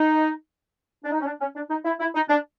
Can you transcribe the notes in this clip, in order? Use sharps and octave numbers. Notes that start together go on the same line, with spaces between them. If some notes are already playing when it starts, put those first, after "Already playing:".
Already playing: D#4
D4
D#4
C#4
D4
C#4
D4
D#4
E4
E4
D#4
D4